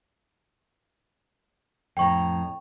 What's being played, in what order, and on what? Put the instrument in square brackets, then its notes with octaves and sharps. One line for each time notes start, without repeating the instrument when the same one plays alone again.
[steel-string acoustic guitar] F2 A2 A#5 [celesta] G5 C#6